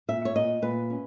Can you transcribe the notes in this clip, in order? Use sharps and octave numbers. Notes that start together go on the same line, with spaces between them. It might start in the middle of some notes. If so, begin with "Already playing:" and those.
A#2 E5
C#5
A#2 D#5
A#2 B4
C#4